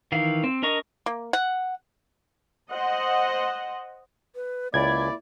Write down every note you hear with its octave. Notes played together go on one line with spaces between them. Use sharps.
D#3 E3 F5
C4
D4 A#4 D#5 A#5 C#6
A#3
F#5
C5 D#5 F#5
B4
C#2 A#3 E4 D5 B5 G#6